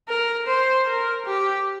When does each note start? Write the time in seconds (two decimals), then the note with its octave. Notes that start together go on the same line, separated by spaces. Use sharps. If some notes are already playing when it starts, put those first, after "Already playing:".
0.08 A#4
0.47 C5
0.87 A#4
1.26 G4